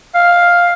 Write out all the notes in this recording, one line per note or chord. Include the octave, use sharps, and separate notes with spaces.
F5